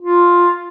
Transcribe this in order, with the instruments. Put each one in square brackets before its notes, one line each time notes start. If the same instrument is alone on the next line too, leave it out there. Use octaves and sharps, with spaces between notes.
[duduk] F4